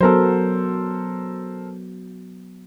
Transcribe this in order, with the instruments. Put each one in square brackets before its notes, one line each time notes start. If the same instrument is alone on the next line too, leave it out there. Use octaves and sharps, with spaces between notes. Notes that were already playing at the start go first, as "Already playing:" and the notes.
[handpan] F#3 B3 [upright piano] A4 A#4 C5